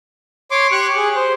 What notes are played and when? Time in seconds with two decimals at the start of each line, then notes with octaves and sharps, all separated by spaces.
0.51 C#5 C6 D6
0.72 G4 C#6 F#6
0.97 G#4
1.16 C5